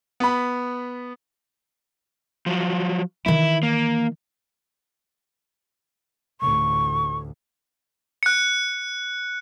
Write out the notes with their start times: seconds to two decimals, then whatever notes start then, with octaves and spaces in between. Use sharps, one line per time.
0.20 B3 B5
2.46 F3 F#3
3.26 D#3 E3 E4
3.63 A#3
6.41 A1 D2 C#6
8.23 F#6 C#7